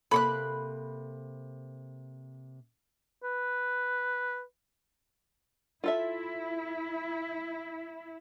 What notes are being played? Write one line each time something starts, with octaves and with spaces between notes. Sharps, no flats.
C3 A#3 A4 B5 C#6 F#6
B4
E4 F4 A4 E5